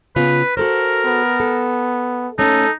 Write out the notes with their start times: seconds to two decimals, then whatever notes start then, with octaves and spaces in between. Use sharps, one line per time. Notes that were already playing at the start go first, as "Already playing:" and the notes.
0.16 C#3 B3 F4 B4
0.57 F#4 A4 A#4 C5
1.06 B3
1.40 A4
2.38 A3 C#4 D#4 A4